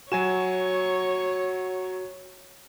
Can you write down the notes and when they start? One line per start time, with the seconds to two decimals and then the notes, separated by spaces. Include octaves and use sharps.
0.12 F#3 F#4 C#5 G#5 E7